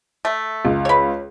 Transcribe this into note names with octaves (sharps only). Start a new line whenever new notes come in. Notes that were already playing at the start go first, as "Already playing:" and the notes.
A3
C#2
B4 C#5